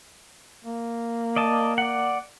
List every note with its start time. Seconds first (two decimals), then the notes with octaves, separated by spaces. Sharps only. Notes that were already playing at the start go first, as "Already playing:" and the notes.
0.65 A#3
1.36 D5 D#5 A5
1.78 D5 F#5